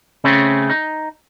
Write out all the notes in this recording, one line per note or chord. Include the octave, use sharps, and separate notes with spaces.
C#3 A3 C4 C#4
D#4